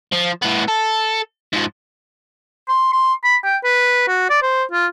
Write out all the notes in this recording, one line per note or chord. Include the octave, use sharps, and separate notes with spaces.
F3
A2 B3
A4
G#2 F3
C6
C6
B5
G5
B4
F#4
D5
C5
F4